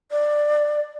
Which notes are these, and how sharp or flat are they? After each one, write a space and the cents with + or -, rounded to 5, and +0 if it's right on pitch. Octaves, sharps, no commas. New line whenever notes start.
D5 +15